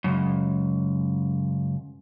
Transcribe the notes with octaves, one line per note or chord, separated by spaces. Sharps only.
C#2 F#2